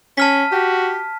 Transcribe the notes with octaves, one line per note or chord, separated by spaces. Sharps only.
C#4 A5 F6 B6
F#4 G4